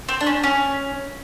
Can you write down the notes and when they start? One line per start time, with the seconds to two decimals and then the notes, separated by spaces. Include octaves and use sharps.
0.09 C4
0.21 D4
0.26 C#4
0.43 C#4